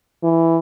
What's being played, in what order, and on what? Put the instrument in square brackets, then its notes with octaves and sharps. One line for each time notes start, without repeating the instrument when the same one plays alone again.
[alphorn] E3